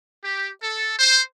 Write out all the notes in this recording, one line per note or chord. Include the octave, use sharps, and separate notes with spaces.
G4
A4
C5